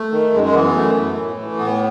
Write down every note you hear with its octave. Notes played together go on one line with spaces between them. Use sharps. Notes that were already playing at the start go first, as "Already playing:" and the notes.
Already playing: A3
D#3
F#2 G#3
G#3
E3 B3
B3
F#2 A3
E3
A2
E3
A2 B3